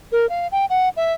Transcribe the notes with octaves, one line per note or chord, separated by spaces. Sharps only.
A#4
F5
G5
F#5
E5